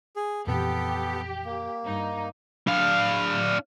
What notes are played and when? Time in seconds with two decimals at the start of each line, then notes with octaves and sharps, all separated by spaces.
0.16 G#4
0.47 F2 A#2 E3 B3 G4 A4
1.45 A#3
1.84 G2 D#4
2.67 D4 F5